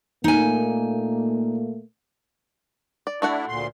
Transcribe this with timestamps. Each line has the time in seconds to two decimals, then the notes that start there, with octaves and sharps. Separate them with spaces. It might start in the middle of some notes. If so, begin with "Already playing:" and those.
0.24 A#2 A3 A#3 D#4 G#5
3.07 D5
3.22 A3 D4 E4 F#4 F#5
3.48 D2 A#2 C6